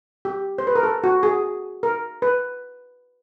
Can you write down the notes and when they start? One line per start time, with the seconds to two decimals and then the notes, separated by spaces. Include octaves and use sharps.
0.25 G4
0.58 C5
0.67 B4
0.75 A#4
0.83 A4
1.04 F#4
1.23 G#4
1.83 A#4
2.22 B4